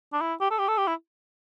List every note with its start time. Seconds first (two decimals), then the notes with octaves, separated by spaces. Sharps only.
0.13 D4
0.21 E4
0.40 G4
0.51 A4
0.59 G4
0.68 A4
0.78 G4
0.88 E4